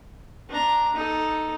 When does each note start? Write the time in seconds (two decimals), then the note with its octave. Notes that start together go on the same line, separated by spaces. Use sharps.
0.50 D4 A#5
0.95 D#4 A4